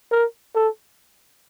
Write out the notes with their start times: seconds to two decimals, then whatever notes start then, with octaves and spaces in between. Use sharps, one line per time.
0.12 A#4
0.55 A4